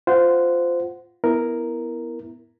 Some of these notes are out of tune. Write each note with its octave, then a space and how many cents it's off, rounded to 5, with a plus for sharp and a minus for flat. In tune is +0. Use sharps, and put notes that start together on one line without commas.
F4 +0 C5 -15 F#5 +0
B3 +0 E4 +0 A#4 +0